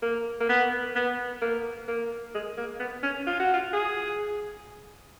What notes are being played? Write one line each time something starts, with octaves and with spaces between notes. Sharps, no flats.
A#3
A#3
B3
B3
A#3
A#3
G#3
A#3
B3
C#4
F4
F#4
F4
G#4